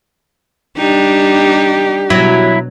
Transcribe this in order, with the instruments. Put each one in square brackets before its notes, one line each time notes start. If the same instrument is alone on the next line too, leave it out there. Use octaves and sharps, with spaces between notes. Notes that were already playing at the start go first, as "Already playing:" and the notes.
[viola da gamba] G3 D4 D#4 [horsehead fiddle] G4
[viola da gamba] B2 [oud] F#3 [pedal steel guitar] E4